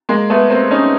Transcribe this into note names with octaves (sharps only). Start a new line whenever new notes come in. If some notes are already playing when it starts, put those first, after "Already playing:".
G#3 A#3
A3 B3
A#3 C4
C#4 D#4